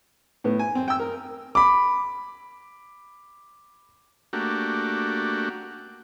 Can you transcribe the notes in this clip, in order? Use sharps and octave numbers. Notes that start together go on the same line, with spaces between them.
A2 B3
G#5
C4
G5 E6
A#4
B5 D6
A3 A#3 D4 F#4 G4